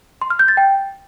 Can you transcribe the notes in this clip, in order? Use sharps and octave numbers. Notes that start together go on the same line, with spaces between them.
C6
F6
G6
A6
G5